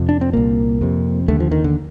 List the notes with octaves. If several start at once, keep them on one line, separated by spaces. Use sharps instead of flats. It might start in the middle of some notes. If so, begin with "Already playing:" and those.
Already playing: F2 C3
D4
C4
C2 A#2 A#3
F2 C3
D#2 D3 A3
F3
D#3
D3